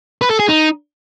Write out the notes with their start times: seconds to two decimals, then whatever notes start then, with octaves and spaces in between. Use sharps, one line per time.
0.22 B4
0.31 A4
0.40 G#4
0.49 D#4